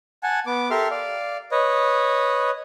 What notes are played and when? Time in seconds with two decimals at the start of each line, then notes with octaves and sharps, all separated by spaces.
0.23 F#5 G#5 A5
0.46 B3 D6
0.70 G4 A4 A#4 E5 C6 F6
0.91 D5 F5
1.52 B4 C#5 D#5